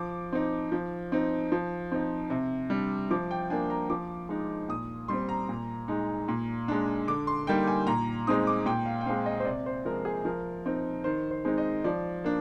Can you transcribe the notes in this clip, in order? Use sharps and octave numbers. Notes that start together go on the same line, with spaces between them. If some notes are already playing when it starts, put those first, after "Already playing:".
Already playing: F3 D6
C4 D#4
F3
C4 D#4
F3
C4 D#4
C3
G3 D4
F3 D6
G5
A#3 D4 G#5
A#5
F3 D6
G#3 D#4
A#2 D#6
G3 C4 C6
A#5
A#2
G#3 D#4
A#2
G#3 D4
D3 D6
C6
G3 A#3 D#4 G5
G#5
A#2 A#5
G#3 C4 D#4 D#6
D6
A#2 G5
F5
G5
G#3 C4 F5
D#5
C5
C3 D5
C5
F3 G#3 A#4
G#4
F3 A#4
C4 D#4
D#3 C5
C5
G#3 C4 D#4
D#5
F3 D5
A#3 D4